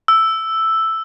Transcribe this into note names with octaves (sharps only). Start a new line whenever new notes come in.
E6